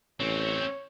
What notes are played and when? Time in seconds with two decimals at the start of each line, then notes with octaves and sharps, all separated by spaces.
0.20 A1 C4 C#4 C#5